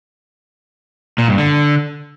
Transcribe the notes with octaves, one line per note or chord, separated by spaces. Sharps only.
A#2
G2
D3